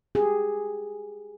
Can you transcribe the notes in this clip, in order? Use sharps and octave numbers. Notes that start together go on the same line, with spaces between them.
G4 G#4